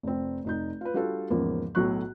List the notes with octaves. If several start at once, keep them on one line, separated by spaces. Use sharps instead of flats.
F1 C4
F1 D#4 G6
F4 B4
G3 D4 F4 F#4 A4
E2 G#2 C#3 F3 A#3
B1 A2 F#3 C#6 F#6